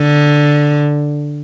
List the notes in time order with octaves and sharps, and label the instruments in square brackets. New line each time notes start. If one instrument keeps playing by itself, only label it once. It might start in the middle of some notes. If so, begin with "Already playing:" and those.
Already playing: [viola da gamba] D3